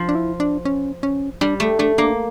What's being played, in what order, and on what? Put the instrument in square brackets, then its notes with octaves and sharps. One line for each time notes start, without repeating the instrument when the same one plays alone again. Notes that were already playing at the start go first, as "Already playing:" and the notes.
Already playing: [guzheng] F3
[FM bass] D4
E4
D4
C#4
C#4
[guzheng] G3 [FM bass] D4
[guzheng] A3
[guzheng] A3 [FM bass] D4
[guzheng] A#3 [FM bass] D4